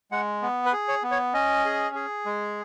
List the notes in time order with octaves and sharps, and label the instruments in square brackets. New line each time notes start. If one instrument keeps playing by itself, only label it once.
[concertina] G#3 F#5
B3
B4
G#4
C#5
B3
C#5
C#4 D#5
G#4
G#4
G#3